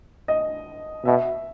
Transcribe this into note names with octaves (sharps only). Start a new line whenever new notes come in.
D#5
B2 E5